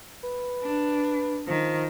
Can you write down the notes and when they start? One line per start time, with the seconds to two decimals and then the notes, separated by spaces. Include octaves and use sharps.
0.23 B4
0.64 D4
1.48 D#3 F3